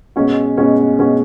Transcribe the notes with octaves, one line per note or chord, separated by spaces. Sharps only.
B2 G#3 C#4 F#4
B2 G#3 C#4 F#4
B2 G#3 C#4 F#4